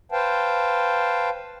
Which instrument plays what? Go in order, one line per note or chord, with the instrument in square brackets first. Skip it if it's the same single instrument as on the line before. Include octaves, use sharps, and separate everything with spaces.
[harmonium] B4 C5 F5 G5 A5